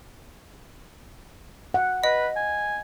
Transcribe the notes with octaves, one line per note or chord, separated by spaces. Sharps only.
F#5
B4 D#5
G#5